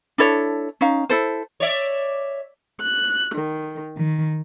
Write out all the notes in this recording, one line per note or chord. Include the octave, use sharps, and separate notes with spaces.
D4 E4 A4 C#5
C#4 D#4 F5
E4 A4 C5
C#5 D5 E5
F#6
D#3
D#3